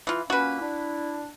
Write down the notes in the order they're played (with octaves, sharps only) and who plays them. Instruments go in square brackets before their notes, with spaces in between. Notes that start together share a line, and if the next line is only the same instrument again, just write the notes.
[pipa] E3 F4
[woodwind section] A#2 A#3 C#4 [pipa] F#4 B4
[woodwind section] D4 E4